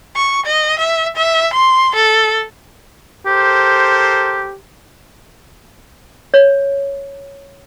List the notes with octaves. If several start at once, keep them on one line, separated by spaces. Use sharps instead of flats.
C#6
D#5
E5
E5
C6
A4
G4 A4 A#4 C5
C#5